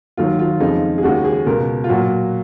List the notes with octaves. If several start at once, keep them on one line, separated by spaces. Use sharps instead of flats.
D#2 D#3 F#3 F4
F4
F2 C#3 F3 G#3 D#4
G#4
D#2 C#3 G#3 F#4
G#4
C#2 B2 G#3 A#4
F4
A#2 F#3 F#4